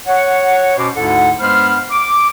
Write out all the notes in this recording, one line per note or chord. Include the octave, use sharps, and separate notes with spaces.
C#5 F#5
B2 C#4 F#4 C5 D6
D2 G#2 D3 E4 A4 F#5
G2 G#3 B3 C5 B5 F6
D6